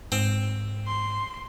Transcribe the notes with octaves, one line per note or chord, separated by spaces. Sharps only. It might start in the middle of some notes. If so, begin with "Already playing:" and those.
G#2 C4
C6